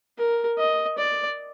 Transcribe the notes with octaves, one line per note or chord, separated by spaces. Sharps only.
A#4
D#5
D5